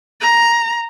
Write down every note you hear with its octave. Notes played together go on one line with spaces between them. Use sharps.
A#5